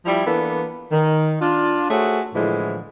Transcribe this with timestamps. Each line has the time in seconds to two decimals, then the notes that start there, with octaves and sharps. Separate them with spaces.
0.05 F3 G3 E4
0.26 E3 A#3 B3 D4 A4
0.91 D#3
1.40 D4 F4
1.89 A3 F#4 G#4 C5 C#5
2.34 A2 D3 E3 F3 G#3